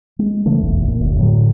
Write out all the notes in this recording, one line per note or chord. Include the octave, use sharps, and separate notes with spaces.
G#3
C#3 E3 A3
F1 B1 E2
A#2
F#1 D2
A2 D3 F3 F#3